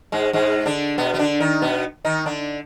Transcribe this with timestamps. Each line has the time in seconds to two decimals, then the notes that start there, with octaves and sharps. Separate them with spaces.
0.12 G#2 G#3
0.33 G#2 G#3
0.65 D3 D4
0.98 B2 B3
1.14 B3
1.19 D3 D4
1.40 D#3 D#4
1.62 B2 B3
2.05 D#3 D#4
2.26 D3 D4